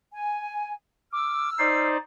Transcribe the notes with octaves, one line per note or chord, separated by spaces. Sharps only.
G#5
D6 E6 F6
D#4 C5 D5 C7